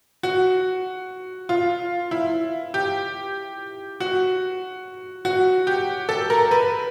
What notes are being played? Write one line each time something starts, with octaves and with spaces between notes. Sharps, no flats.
F#4
F4
E4
G4
F#4
F#4
G4
A4
A#4
B4